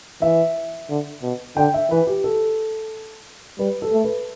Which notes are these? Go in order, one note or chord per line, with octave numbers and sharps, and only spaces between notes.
E3 E5
D3
B2
D3 G5
E5
E3 B4
G4
A4
G3 B4
A4
A3
B4